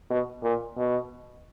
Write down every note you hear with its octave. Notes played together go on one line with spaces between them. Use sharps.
B2
A#2
B2